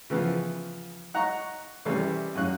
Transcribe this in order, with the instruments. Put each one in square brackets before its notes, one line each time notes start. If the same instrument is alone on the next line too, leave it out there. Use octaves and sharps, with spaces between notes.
[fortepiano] C#3 E3 F3 B3
D#4 F#5 A#5 C#6 F#6
C3 E3 G3 A3 C#4 A4
F#2 C#4 F#6